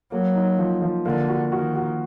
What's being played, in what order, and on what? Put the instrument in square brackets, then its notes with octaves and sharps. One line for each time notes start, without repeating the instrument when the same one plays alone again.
[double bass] F#3 [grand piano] A#3
[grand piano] D#4
F3
F3
[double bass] D3 [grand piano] A#3
[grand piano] F#4
[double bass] D#3 [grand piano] F#4
[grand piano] F#4